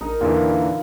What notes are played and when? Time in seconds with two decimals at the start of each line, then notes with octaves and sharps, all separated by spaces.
0.01 A#1 D#4 A#4
0.21 E2 A#2 D3 E3 F4